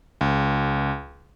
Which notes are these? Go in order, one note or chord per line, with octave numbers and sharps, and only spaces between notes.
C#2